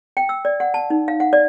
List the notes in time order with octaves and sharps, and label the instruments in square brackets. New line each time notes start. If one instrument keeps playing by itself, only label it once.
[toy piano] G5
E6
D5
F#5
A5
D#4
F5
F#5
D5